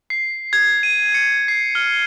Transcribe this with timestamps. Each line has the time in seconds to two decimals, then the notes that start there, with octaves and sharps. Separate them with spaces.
0.10 C7
0.53 G#6
0.83 D#7
1.14 C#7
1.48 C7
1.75 F6